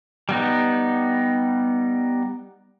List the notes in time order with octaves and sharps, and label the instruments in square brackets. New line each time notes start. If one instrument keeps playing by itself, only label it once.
[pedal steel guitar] G3 B3 D#4